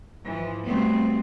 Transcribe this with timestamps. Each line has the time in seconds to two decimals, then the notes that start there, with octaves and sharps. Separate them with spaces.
0.24 G#2 E3 F3
0.67 F#3 G3 A3 B3 C4